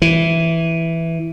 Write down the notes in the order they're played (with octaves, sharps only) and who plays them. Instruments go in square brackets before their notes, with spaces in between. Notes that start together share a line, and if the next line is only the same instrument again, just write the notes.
[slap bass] E3